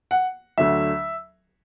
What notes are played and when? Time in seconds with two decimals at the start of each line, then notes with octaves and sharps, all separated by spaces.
0.11 F#5
0.58 D2 D3 F#3 E5